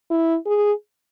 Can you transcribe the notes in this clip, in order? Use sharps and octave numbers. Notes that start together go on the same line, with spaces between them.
E4
G#4